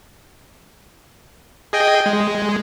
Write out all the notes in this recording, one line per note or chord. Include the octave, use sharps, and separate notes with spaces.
G#4 D#5 G5
G#3